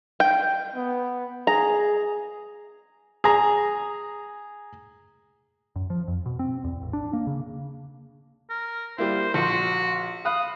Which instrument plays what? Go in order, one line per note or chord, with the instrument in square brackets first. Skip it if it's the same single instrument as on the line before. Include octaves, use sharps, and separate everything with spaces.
[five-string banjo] G5
[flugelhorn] B3
[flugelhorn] G#4 [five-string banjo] A#5
[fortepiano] G#4 A#5
[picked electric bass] F#2
F3
F2
B2
C4
E2
A1
D4
A#3
C#3
[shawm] A#4
[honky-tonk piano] G3 A#3 E4 [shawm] C5
[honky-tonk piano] A#1 C6 [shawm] F#4
[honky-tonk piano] F5 B5 F#6 [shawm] D#6